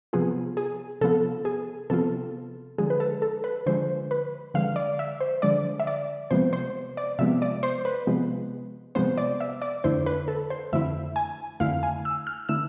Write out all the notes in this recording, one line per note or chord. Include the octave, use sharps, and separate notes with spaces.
C3 F3 B3 F4 G#4
G#4
C3 F3 B3 F4 A4
G#4
C3 F3 B3 F4 A4
D3 F3 G#3 G#4
B4
A4
A4
B4
D3 F3 G#3 C5
B4
D3 F3 G#3 F5
D5
E5
C5
D3 F3 G#3 D5
E5
D5
C3 F3 G#3 B3 C5
C5
D5
C3 F3 G#3 B3 E5
D5
C5
B4
C3 F3 G#3 B3
C3 F3 G#3 B3 C5
D5
E5
D5
F2 D3 A3 E4 C5
B4
A4
C5
F2 D3 A3 E4 E5
G#5
F2 D3 A3 E4 F5
G#5
E6
F6
D3 A3 E4 E6